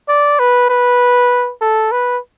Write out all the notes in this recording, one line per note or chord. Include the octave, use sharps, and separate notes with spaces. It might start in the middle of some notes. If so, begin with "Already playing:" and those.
D5
B4
B4
A4
B4